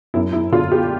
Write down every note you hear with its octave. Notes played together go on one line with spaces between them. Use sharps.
F#2 E4
E4
D3 F4
G4